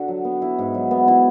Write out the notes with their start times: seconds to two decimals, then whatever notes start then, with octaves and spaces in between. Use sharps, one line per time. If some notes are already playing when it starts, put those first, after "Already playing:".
Already playing: D3 F#4
0.08 F#3
0.25 B3
0.42 E4
0.59 G#2
0.74 F#3
0.91 B3
1.08 E4